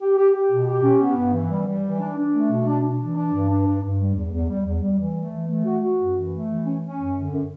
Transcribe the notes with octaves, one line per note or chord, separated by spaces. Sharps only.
G4
G4
G4
B2
G4
C#4
B3
G2
E3
G3
G3
E3
D4
D4
A3
B2
D4
D4
E3
D4
G2
D4
G2
G2
G3
E2
E2
G3
E2
G3
E3
A3
E3
A3
F#4
F#4
F#2
E3
A3
E3
C#4
C#4
F#2
D3
F#2